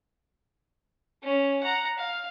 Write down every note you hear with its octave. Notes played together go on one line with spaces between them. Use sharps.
C#4
F#5 A#5
F5